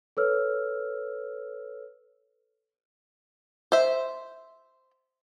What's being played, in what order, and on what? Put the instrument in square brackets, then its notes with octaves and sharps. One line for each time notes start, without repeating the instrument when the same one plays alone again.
[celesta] A4 B4 C#5 E6 F6
[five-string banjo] C5 E5